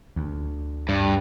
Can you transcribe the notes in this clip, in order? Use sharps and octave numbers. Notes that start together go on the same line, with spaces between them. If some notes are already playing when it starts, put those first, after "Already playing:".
D2
G2